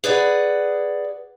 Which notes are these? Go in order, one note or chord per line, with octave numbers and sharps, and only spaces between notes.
G#4 B4 D5 F#5